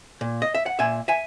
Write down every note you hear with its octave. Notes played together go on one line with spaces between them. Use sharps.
A#2
D#5
E5
F#5
A#2 E5 G#5
E5 G#5